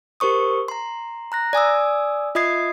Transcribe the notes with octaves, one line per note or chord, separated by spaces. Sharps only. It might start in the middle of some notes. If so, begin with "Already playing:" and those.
G4 A#4 C5 C#6 D#6
A#5 C6
A#5 F#6 A#6
D5 G#5 D#6 E6
F4 D#5 E5 D#6 G#6 C7